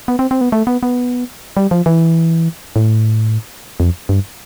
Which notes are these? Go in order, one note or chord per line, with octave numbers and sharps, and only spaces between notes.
B3
C4
C4
B3
A3
B3
B3
G3
F3
E3
A2
F2
G2